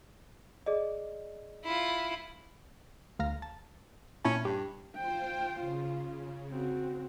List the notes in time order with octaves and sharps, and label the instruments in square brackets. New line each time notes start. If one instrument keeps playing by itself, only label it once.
[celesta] G#4 D5 D#5
[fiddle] E4 F4
[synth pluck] D2 F5 A#5
A5
[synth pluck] A#2 E4 A5 [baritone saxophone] C#4
[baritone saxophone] G2 [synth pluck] G4
[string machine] F4 C5 [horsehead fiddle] G5
[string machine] C#3 [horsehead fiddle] F4
[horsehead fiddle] C4 F#4